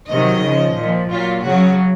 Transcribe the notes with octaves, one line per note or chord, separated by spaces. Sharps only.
C3 D#3 F#3 D#5
C#3 F3
A#2 F3
A#2 F#3 F4
C#3 F#3 F#4